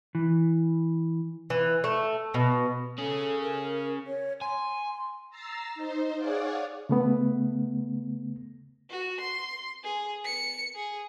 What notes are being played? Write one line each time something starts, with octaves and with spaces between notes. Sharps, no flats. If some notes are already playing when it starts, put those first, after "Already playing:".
E3
E3
A3
B2
C#4 G#4 A4
A#4
C#5
G#5 C6
A#5 E6 A6 C7
D#4 C5
G#4 C#5 D5 F5 F#5
C#3 A3 B3
F#4
C6
G#4
C#7
G#4